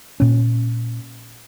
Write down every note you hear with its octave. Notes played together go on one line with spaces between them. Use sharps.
A#2 C#4